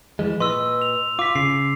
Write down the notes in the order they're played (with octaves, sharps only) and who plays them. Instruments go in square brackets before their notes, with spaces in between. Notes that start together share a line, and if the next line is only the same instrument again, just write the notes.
[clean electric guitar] E3 F3 G#3
[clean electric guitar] A#2 B4 D#5 [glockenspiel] C6 E6
[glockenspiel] F7
[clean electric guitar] F4 [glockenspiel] D6 B6
[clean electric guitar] C#3 [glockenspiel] C7